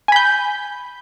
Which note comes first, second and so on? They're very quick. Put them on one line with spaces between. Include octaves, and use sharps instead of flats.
G#5 B5 G6